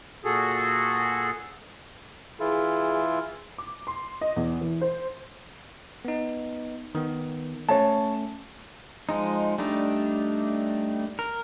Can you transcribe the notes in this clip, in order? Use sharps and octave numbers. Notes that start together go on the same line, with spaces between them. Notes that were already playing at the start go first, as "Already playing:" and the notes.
A#2 F#4 G#4 A4
E3 E4 F4 G#4
D6
C6
D#5
E2
E3
C5
B3 D#4
D#3 B3
A3 C#4 C#5 A5
F3 G#3 D#4
G3 A3 D4 D#4
A#4